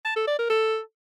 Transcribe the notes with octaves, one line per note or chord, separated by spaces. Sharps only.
A5
A4
D5
A#4
A4